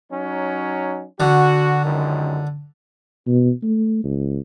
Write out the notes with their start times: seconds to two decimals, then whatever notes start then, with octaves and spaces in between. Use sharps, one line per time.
0.12 F#3 C#4 D#4
1.20 D3 F#4
1.85 C#2 F#2 D#3
3.27 B2
3.63 A3
4.04 C#2